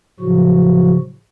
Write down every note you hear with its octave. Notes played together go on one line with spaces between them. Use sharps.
A2 C#3 F3 F#3 F#4